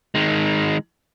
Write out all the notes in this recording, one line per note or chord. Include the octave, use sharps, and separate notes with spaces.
D#3 G#3